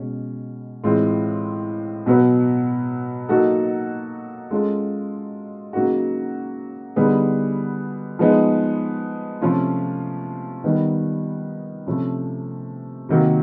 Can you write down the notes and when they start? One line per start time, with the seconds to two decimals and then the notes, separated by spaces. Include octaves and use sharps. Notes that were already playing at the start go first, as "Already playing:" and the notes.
Already playing: B2 G#3 C#4
0.84 A2 E3 G#3 C4 F4
2.06 B2 F#3 B3
3.29 F#3 A#3 D#4 F#4 A4
4.51 G#3 C#4 F4 A4
5.73 C#3 F#3 A#3 D#4 F#4
6.96 D3 G3 B3 D#4 G#4
8.19 F3 G#3 B3 D#4 G#4
9.41 C3 F3 A3 C#4 F4
10.64 D#3 G3 B3 D#4
11.87 C3 F3 A3 C#4
13.09 C3 D#3 F#3 A#3